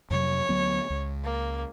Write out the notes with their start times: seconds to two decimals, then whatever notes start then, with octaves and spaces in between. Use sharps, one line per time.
0.10 F2 C3 F#3 C#5
0.49 D2 F#3 B3
0.90 C#2
1.24 A#3